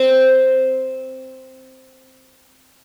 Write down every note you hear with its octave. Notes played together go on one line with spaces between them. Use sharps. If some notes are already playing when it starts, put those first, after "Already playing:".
Already playing: C4